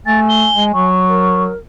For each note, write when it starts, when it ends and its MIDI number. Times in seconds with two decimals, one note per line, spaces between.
0.06 0.48 57
0.06 0.86 80
0.06 0.20 93
0.29 0.64 103
0.55 0.74 56
0.74 1.52 54
0.74 1.43 85
1.08 1.57 70